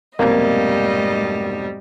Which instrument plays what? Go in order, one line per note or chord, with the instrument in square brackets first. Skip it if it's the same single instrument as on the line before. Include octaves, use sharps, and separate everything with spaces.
[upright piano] F1 B1 C4 [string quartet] G#2 D#5 [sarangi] G3 [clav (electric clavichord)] A#3